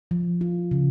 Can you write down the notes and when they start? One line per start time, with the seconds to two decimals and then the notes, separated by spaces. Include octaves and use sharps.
0.11 F3
0.41 F4
0.71 C#3